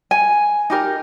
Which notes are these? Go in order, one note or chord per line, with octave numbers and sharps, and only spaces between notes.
G#5
D#4 G4 A#4